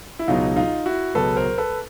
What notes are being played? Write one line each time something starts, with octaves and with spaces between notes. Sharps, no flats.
E4
C#2 B2 F#3 D#4 F4
D#4 F4
E4 F#4
C#2 B2 F#3 A4 B4
A#4 C5
A4 B4